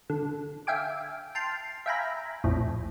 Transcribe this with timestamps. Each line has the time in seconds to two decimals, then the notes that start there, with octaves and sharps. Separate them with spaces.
0.10 D3
0.67 E5 F5 G5 G#5 D6
1.35 G5 A5 C6 F6
1.86 E5 F5 G5 G#5 A#5 B5
2.44 A#1 F2 A2